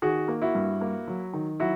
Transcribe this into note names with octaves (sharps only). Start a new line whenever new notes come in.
D#3 F#4 G#4
A#3
E4 F#4
G2
A#3
F#3
D#3
F#3 E4 F#4